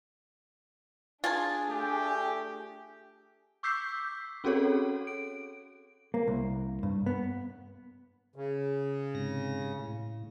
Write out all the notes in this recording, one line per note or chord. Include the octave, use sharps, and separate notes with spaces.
D4 F4 G#4 G#5 A5
A3 G4
C#6 D6 E6 G6 B6 C7
C4 C#4 F#4 G#4 A4 C#5
D7
A#3
C2
G2
B3
C#3
G#2 C3 A#6
A2